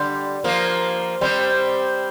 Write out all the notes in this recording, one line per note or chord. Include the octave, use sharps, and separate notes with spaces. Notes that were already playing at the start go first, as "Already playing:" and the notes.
Already playing: D3 G3
F3 A#3
G3 C4